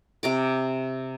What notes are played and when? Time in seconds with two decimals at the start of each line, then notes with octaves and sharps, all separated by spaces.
0.23 C3 A#5 D6